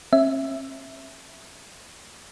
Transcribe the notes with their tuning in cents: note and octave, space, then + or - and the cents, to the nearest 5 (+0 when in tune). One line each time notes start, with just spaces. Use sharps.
C#4 -45 E5 +0